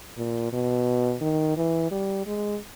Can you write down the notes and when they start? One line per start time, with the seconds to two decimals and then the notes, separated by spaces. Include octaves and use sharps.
0.18 A#2
0.53 B2
1.21 D#3
1.57 E3
1.91 G3
2.26 G#3